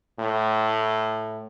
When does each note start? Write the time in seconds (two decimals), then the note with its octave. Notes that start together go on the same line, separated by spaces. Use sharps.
0.19 A2